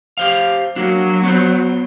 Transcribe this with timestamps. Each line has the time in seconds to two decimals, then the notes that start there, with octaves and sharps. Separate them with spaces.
0.17 G4 C5 F5
0.76 F#3 A#3 D4
1.24 B3 C5